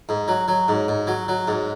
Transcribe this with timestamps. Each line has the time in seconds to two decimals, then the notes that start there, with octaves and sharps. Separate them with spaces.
0.09 G#2
0.28 F#3
0.48 F#3
0.68 G#2
0.88 G#2
1.07 F#3
1.28 F#3
1.48 G#2